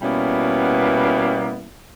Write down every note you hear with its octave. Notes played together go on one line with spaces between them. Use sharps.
B2 G3 A#3 B3 C#4 E4